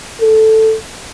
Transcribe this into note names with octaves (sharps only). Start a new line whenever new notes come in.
A4